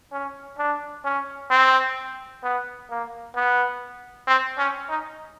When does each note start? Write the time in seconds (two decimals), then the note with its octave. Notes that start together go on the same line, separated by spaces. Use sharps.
0.12 C#4
0.58 D4
1.05 C#4
1.51 C4
2.43 B3
2.90 A#3
3.35 B3
4.27 C4
4.58 C#4
4.89 D#4